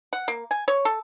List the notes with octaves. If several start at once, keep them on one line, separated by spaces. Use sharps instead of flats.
F#5
A#3
G#5
C#5
A4